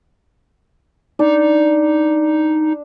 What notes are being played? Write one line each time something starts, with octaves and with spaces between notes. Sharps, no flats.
D4 D#4